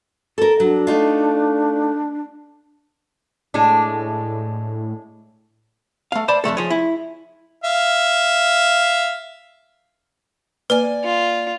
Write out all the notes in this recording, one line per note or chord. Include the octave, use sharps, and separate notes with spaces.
A4 A#4
F#3 D4
A3 D#4 F4
A2 G#3 D4
A3 F5
C5 D5 A5 B5
F2 B2 A3 A4
F3 G#4 C#5
E4
E5 F5
A#3 B4 D5 G#5
F4